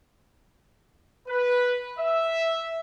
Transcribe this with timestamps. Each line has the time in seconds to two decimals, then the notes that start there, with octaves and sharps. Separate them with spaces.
1.28 B4
1.99 E5